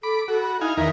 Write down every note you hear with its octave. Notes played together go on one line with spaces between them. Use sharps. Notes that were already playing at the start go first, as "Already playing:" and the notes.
A4 B5 D6
F#4 A4
B5
D#4 E4 F5 G#5
E2 D#3 A#4 E5